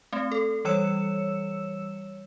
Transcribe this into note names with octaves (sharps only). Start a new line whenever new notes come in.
A3 C4
A4
E3 G3 C#5 E6 C#7 E7